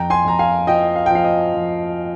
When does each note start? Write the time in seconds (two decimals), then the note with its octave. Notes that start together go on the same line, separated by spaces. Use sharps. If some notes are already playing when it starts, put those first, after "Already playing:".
Already playing: F2 G5 A#5
0.10 G#5 C6
0.25 F2 A#5
0.39 F5 G#5
0.67 F3 D#5 G5
0.96 F5
1.06 G5
1.11 F3 F5
1.24 D#5
1.54 F3